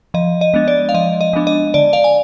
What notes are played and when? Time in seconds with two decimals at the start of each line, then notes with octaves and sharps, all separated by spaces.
0.14 F3 D#5
0.41 D#5
0.54 G#3 B3 D4
0.68 D5
0.89 F5
0.94 F3 D#5
1.21 D#5
1.33 G#3 B3 D4
1.47 D#5
1.74 D3 D5
1.93 D5 F5
2.04 G#5